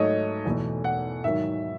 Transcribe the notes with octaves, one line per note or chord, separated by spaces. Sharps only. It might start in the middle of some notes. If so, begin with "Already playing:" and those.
Already playing: G#2 F#3 A3 C#5 D#5
E2 B2 A3
F#5
G#2 D#3 F#3 E5